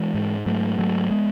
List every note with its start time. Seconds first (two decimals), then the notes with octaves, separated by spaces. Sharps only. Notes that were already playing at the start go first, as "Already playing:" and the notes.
Already playing: E3 G#3
0.15 G#2
0.46 G#2 F#3 A3
0.78 G#2 F#3 A3
1.11 G#3 B3